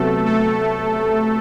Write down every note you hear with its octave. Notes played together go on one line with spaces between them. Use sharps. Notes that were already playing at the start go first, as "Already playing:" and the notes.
Already playing: C3 F#3 A3 B3 A4
A3 A4